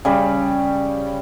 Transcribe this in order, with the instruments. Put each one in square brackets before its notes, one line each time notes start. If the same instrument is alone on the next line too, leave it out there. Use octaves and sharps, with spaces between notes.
[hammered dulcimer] C#3 G3 B5